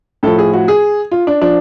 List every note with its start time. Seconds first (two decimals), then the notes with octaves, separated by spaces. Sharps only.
0.23 A2 F3 A4
0.38 G#4
0.53 F#4
0.68 G#4
1.11 F4
1.27 D4
1.41 F3 D4